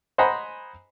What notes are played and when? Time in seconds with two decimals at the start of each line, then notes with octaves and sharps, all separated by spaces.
0.18 C5 D#5 F#5 G#5 A#5 B5